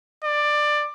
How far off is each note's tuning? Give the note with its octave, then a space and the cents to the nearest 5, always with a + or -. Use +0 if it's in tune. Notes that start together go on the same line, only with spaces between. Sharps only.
D5 +15